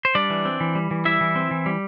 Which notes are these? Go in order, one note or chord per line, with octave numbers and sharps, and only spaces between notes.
C5
G3 D4 D5
E3
C4
E3
G3
E3
G3 E4 E5
E3
C4
E3
G3